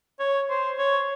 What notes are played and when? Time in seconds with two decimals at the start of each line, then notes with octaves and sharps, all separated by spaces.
0.19 C#5
0.49 C5
0.78 C#5